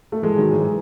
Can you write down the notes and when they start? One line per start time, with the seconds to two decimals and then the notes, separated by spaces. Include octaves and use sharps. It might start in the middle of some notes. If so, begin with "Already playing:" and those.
0.12 A3
0.22 E3 G#3
0.37 D#3 F#3
0.53 E3 G#3